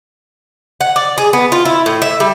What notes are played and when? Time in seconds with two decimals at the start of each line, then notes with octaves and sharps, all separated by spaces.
0.81 F#5
0.96 D5
1.18 G#4
1.33 B3
1.52 F4
1.65 E4
1.86 A2
2.02 E5
2.20 G3